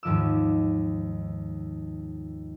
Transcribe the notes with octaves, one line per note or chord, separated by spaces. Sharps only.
D#2 G#2 F3 D6 E6